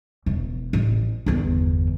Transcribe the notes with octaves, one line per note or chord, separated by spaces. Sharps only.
E1
A1
G1 E2